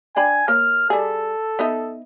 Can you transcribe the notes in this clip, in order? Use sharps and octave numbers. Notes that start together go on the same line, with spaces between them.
D4 G5 G#5 B5
A#3 C#5 F6
G3 G#4 A4
B3 D#4 E5